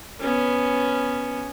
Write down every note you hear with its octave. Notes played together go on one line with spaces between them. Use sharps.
B3 C#4